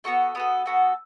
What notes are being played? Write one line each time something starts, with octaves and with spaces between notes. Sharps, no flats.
B3 F#4 A4 C#6
B3 F#4 A4 D#6
B3 F#4 A4